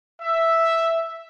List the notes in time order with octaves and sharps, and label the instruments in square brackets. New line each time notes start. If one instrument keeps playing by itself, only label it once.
[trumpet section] E5